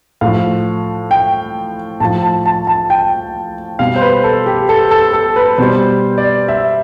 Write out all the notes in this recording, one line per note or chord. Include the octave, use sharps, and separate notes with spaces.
A2 F3 F5
G5
A2 F3 A5
A5
A5
A5
G5
B2 G3 F5
C5
B4
A4
G4
A4
A4
A4
B4
B2 G3 C5
D5
E5